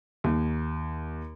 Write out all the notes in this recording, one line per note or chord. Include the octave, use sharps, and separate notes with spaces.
D#2